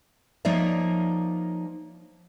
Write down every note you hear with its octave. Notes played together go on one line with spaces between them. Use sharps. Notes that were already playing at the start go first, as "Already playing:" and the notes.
F3 A#3 D#4 C#5 D5 E5